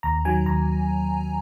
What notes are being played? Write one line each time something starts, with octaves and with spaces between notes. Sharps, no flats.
D#2 A#5
D#3 F#3 G#5
D#2 A#5